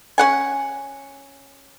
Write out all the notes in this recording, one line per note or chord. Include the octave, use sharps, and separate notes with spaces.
C#4 F#5 G#5